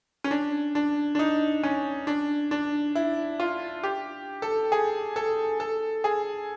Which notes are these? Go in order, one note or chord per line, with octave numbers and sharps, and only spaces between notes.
C#4
D4
D4
D4
D#4
C#4
D4
D4
E4
F4
G4
A4
G#4
A4
A4
G#4